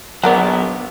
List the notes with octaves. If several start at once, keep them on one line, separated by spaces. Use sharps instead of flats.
A#1 F#3 B3 F#4 A#4 D5